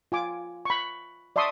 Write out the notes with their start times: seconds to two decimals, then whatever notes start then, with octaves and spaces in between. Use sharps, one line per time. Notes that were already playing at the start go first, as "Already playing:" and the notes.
0.12 F4 G#5 D6
0.65 B5 C#6
1.36 D5 E5 A5 C6 C#6 D#6